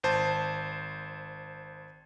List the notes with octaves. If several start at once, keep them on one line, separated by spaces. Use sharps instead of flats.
G#1 C5 A5